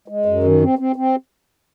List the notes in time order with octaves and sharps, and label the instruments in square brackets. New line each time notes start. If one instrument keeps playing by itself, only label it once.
[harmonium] G#3
F#2
D#3
C4
C4
C4